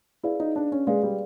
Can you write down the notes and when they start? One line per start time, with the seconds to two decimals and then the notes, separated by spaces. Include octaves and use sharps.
0.23 E4 G#4 B4 D5 F5
0.40 D#4
0.56 D4
0.72 C#4
0.87 G#3 G#4 B4 D5 F5
1.03 G3